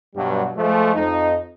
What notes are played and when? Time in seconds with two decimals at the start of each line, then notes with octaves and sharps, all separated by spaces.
0.16 G2 B2 F#3 G3
0.57 F3 G#3 A3
0.94 F2 D#4